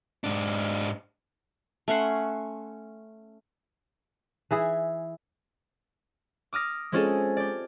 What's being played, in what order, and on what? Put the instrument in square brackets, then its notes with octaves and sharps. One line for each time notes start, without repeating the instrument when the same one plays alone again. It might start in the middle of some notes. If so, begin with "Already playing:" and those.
[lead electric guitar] G#2 D4
[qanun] A3 C#4 F#5 C6
[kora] E3 E4 G#4
[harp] D6 D#6 F6 A#6
G#3 C4 C#4 F4 G#4 A4
G4 D5